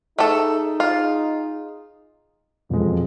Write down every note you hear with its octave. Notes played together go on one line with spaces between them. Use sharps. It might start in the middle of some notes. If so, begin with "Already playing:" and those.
A3 D#4 G#4 A4
F4
E1 F2 G#3